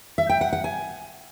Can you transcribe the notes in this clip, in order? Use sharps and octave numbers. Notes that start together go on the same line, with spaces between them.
E5
G5
F#5
F#5
G#5